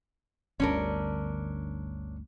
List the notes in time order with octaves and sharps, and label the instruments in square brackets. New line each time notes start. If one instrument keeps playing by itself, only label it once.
[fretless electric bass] G1 D2 [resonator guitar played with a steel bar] C#4 D4 A#4